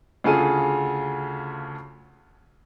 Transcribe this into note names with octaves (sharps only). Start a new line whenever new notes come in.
D2 C#3 F4 G#4 A4 D#7